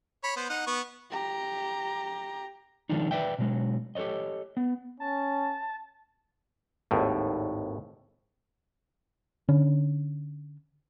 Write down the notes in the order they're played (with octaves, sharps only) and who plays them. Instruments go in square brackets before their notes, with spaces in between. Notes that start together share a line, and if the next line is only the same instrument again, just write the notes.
[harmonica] C#5 B5
B3 C5
D#4 F#5
B3 C#6
[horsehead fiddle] G4 A#5
[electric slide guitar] D#3 F3 G#3 D4 D#4
B4 D5 E5 G5
B2 F#3 G#3
G4 A4 B4 C#5 D#5
B3
[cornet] C#4 [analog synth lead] A5
[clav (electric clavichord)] G#1 D#2 A2
[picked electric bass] D3 C#4